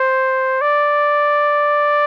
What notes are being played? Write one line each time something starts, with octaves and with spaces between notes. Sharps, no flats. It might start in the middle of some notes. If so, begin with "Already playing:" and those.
Already playing: C5
D5